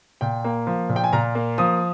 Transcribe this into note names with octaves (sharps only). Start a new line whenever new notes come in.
A#2 G5
A#3
F3
A#2
G5
G#5
A#2 A#5
A#3
F3 D#6